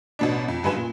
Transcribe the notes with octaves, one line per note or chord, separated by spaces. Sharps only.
A1 B2 D4
F2
F#1 G2 F#3 B4 G#5 E7
A#2